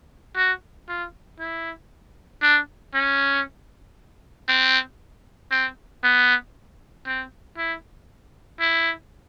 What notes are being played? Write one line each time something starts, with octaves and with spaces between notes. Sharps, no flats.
F#4
F4
E4
D4
C#4
C4
C4
B3
C4
E4
E4